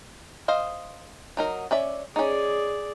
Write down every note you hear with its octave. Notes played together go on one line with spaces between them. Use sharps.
C5 D#5 F5
F#3 D#4 A#4
C#4 D5 E5
C#4 D#4 G#4 D5